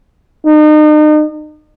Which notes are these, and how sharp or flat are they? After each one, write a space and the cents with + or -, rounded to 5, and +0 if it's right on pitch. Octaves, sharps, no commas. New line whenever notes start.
D#4 -35